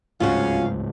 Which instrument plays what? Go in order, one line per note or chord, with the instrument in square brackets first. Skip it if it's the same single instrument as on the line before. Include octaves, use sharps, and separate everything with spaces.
[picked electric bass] D1 C#2 G#2 [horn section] C#4 F5 [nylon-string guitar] F4 F#4